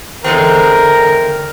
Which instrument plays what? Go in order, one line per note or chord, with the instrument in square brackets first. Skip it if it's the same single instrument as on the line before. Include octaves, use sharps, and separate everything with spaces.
[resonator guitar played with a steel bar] E2 G#3 C4 [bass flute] D3 [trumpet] A#4